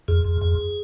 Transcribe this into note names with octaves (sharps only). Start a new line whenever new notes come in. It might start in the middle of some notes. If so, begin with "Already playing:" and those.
F2 G#4
F2
F2